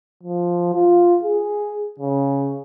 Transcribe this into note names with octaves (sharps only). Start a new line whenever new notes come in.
F3
F4
G#4
C#3